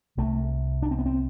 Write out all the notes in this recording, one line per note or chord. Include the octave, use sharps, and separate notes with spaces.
C2 C3 A3
D4
C4
B3
C4